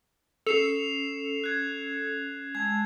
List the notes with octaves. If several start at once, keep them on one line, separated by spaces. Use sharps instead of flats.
C#4 A4 C7 E7 F7
F#6 G#6
G#3 A5 E6 G#6